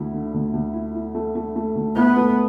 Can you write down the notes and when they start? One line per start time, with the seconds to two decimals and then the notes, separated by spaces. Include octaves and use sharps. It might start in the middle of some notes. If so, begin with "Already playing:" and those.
Already playing: D2 E4
0.12 D3
0.34 D2
0.53 D2
0.73 E4
0.94 E4
1.15 A3
1.35 A3
1.56 A3
1.75 D2
1.96 B3 E4
2.17 A3